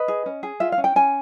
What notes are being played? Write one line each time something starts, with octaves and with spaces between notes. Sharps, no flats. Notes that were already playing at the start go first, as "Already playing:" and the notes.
Already playing: B4 D#5
G#4
C#4
G#4
F4 E5
F5
C#4
G5
C#4 G#5